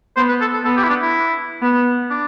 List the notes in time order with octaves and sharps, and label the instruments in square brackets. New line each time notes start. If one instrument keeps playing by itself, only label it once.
[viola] B3 [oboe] C5
[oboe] B4
A4
A4
[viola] B3 [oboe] A4
[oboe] G4
E4
D4
E4
[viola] B3
[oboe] D4